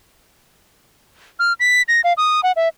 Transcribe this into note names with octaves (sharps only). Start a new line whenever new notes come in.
F6
B6
A#6
F5
D#6
F#5
E5